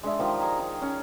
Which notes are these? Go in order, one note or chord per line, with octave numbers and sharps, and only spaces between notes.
G#3 D4 E5
D#3 F3 G4
G#4 A#5
D#4
C#4